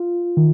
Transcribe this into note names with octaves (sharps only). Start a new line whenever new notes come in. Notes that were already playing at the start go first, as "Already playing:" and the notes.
Already playing: F4
D#3